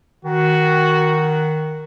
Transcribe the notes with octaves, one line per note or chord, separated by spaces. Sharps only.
D#3 F#4